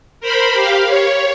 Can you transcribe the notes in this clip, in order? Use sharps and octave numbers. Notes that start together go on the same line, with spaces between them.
A#4 C5 B5
G4 F5
C#5